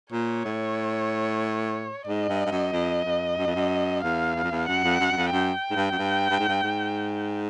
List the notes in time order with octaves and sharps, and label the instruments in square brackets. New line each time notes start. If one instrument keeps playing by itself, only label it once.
[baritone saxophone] A#2 [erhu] C#5
[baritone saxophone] A2
[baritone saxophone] G#2 [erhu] D#5
[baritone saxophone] G2
G2
F#2
F2
F2
F#2
F2
F#2
[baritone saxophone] E2 [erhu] F5
[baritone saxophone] E2
F2
E2
[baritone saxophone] F#2 [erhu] F#5
[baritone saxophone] F2
F#2
F#2
F2
[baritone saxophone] F#2 [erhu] G5
[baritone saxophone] G#2
G2
F#2
G2
G2
G#2
G2
G#2